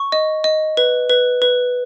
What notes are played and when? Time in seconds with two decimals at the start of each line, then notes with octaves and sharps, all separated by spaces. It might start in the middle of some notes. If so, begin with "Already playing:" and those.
Already playing: C#6
0.12 D#5
0.44 D#5
0.77 B4
1.10 B4
1.42 B4